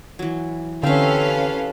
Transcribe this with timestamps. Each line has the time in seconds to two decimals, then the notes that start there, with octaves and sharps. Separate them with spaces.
0.19 E3 F#3
0.83 D3 C4 C#4 G4 A4 B4 E5 F5